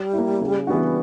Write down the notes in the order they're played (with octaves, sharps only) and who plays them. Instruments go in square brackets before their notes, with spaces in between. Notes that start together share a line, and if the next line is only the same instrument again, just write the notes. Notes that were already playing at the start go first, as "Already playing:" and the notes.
Already playing: [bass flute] G3
[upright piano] E4
A#3
C#3
E3 B3 D4 F#4